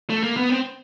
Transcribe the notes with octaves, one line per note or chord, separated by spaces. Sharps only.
A3
A#3
B3
C4